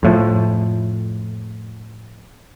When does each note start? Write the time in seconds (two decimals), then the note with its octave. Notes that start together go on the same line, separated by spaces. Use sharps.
0.03 F2 A2 F3